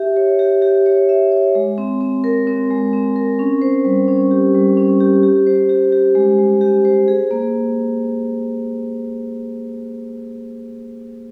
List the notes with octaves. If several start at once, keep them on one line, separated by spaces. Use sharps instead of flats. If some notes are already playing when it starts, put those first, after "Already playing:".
Already playing: G4 E5
C#5
G4
G4
C#5
E5
C#5
G#3
C4
C4
A#4
C4
G#3
C4
A#4
C#4
C5
G3
C#4
G4
G3
C#4
G4
G4
C5
G4
G4
G#3
G#3
G4
C5
G#4
A#3